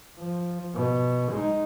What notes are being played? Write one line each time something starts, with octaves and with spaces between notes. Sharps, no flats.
F3
B2
G#3 D#4